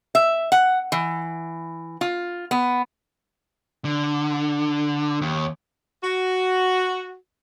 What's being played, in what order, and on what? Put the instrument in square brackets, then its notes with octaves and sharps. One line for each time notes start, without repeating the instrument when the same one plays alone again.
[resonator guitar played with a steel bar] E5
F#5
E3
F4
B3
[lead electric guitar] D3
D#2
[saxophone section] F#4